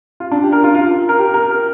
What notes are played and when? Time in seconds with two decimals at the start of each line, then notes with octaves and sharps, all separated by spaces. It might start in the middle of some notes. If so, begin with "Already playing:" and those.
0.20 F4
0.31 D4
0.42 G4
0.52 A#4
0.64 F4
0.75 F4
1.09 A#4
1.18 G4
1.34 A#4
1.51 A#4